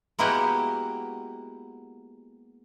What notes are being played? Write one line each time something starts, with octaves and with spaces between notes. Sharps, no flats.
G#3 A#3 B3 E4 F#4 G4